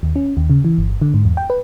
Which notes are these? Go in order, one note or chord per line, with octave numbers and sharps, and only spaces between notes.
D#2
C#4
D#2
C#3
E3
G1
D3
G#2
E2
G5
B4